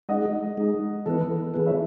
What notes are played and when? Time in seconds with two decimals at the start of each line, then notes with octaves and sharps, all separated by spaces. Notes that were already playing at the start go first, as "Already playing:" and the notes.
0.09 G#3 D#4 G#4 D#5 F#5
0.57 G#3 D#4 G#4
1.06 E3 B3 E4 A4 B4
1.54 E3 B3 E4 G#4 B4
1.66 C#5 E5